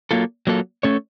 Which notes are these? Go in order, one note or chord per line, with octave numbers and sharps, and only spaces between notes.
F#3 A#3 F4 A4
F#3 A#3 F4 A4
A3 C#4 A4 C#5